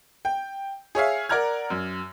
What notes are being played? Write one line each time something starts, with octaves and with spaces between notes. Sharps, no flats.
G5
G#4 C#5 E5 F5
A#4 D5 F#5 A#5 F6 G#6
F#2